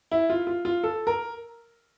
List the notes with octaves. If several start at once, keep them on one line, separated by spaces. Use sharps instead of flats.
E4
F4
F4
F4
A4
A#4